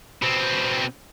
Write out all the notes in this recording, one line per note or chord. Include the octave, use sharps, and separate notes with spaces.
B2 C4